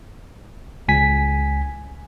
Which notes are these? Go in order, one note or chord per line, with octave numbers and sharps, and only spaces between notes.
C#2 G#5 B6